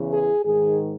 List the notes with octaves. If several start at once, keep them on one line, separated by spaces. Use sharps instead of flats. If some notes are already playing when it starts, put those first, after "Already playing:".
Already playing: E2 C#3 E3
G#4
G#2 D#3 G#4